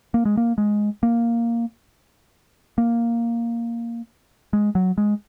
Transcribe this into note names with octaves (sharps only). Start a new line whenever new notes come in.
A#3
G#3
A#3
G#3
A#3
A#3
G#3
F#3
G#3